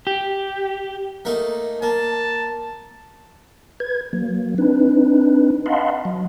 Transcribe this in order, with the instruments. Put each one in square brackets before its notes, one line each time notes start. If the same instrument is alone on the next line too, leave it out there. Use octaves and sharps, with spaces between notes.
[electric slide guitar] G4
[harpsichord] A3 A#3 D#4
[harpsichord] A#3 [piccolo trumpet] A5
[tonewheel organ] B4 G#6
F#3 A#3
C4 D4 D#4 B4
D#5 F5 F#5 A5 B5 C6
F#3